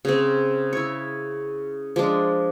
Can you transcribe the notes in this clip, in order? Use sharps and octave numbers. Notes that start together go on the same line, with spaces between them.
C#3 C4
E4 C#5
F3 G#3 D4